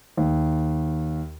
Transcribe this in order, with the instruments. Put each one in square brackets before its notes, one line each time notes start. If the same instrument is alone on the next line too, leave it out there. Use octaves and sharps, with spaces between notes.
[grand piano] D#2